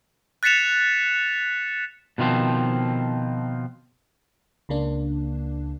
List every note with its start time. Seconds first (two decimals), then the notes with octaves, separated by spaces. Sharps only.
0.43 F#6 A6 B6 C#7 E7 F7
2.18 B2 D#3 F3 C4
4.69 C#2 C#3 A#3 D4